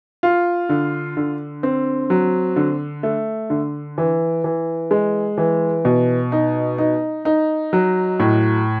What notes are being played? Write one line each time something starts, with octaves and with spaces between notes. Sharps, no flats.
F4
D3
D3
C4
F#3
D3
A3
D3
E3
E3
G#3
E3
B2
D#4
D#4
D#4
F#3
A2